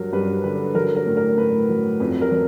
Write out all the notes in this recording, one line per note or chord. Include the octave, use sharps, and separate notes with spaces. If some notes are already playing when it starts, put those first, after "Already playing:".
Already playing: G2 F#3 A#4
G2 B4
D3 B4
F#3 A#4
A#4
A2
A#4
A2 B4
F#3
F2 B4
A#4
F#3